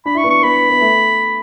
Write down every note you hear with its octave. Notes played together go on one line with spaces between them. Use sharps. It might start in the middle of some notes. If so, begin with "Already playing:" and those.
D4 B5
E4 C#6
B3 D4
C#6
B3 B5
B3
A3